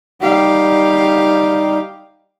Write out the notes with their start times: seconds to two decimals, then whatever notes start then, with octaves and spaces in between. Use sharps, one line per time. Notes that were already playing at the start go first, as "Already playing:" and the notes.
0.22 G3 D#4 G4 F5